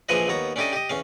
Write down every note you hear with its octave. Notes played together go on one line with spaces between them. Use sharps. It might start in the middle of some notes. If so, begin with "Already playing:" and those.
A#1 E3 F3 G#4 B4 D#5
D#2 B3 C#5 A#5
C#4 D4 E4 G4 A4 D#5
G4 D#5
E2 C#4 F5